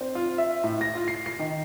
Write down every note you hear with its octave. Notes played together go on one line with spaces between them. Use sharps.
C4
F4
E5
A2
A#6
F4
C7
C7
D#3